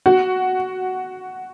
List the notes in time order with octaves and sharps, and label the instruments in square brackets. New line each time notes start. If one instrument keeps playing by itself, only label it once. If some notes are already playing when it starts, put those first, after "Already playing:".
[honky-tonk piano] F#4